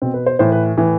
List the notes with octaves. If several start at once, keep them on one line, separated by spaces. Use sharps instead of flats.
B2 C4
B4
C5
A2 E3 C5
B4
A2 E3